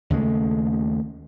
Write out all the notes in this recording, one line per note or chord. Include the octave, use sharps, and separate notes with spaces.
D#2 C#3 G#3 A3